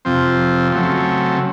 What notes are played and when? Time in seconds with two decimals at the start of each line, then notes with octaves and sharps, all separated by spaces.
0.05 F2 C3 F3 C4
0.72 C#3 F#3 A3 C4